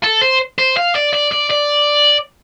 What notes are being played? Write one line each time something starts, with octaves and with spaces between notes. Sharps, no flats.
A4
C5
C5
F5
D5
D5
D5
D5